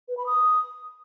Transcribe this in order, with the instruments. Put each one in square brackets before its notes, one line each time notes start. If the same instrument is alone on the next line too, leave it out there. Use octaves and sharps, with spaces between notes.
[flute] B4
B5
D#6